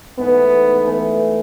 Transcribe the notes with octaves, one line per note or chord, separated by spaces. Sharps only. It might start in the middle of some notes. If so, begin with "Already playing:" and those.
G#2 E3 A3 B3
E3 A3